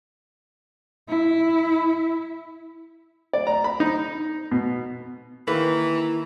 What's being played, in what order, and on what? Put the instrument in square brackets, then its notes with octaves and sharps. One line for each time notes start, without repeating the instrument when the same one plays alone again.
[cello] E4
[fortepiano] D5
A#5
B5
D#4
B2
[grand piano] D#3 A#3 [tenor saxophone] E3 [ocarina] E4 [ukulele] B4